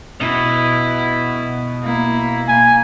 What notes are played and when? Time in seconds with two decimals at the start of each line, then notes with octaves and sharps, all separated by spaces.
0.20 B2 E4
1.83 A#3 E4
2.48 A#3 G#5